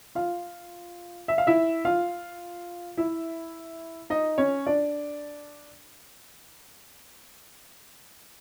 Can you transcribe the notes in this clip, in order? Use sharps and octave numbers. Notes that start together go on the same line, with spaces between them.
F4 F5
E5
F5
E4 E5
F4 F5
E4 E5
D#4 D#5
C#4 C#5
D4 D5